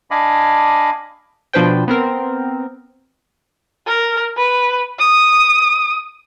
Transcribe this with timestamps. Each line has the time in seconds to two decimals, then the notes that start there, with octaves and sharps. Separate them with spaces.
0.11 D4 D#5 F5 G#5 B5 D6
1.53 B2 F3 D4 B4 C5 G5
1.88 B3 C4 A#4
3.87 A#4
4.37 B4
4.99 D#6